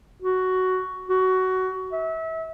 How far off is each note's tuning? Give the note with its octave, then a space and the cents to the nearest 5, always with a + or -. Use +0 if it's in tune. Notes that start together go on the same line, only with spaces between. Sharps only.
F#4 +10
F#4 +15
E5 -30